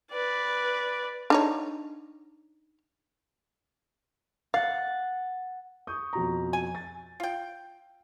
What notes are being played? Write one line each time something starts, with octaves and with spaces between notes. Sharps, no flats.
B4 D5
D4 D#4 C#5
F5 F#5 A6
C#6 D#6 G6
F2 B2 A#5
G#5
A6
F4 G5